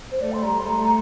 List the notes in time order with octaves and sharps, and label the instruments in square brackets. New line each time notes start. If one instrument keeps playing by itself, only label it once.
[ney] C5
[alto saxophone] A3 [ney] D5
[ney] C6
[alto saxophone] G3 [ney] A#5
[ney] C6
[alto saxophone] A3 [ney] A#5
[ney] A#5